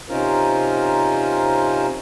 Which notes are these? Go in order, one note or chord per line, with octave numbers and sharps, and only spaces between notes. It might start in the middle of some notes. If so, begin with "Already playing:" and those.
C3 C#4 D#4 F4 A#4 C5